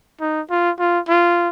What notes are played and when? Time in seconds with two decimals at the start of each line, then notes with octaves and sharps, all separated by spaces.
0.20 D#4
0.50 F4
0.79 F4
1.09 F4